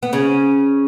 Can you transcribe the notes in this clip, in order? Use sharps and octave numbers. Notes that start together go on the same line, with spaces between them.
B3
C#3 C#4